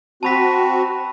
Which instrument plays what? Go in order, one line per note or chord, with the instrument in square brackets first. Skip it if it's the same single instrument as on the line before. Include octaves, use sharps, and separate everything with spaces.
[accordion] C4 F#4 [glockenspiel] A5 B5 B6